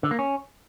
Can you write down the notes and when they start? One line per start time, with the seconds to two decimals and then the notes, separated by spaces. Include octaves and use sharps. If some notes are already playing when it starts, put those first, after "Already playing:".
0.03 D3
0.11 A#3
0.19 C#4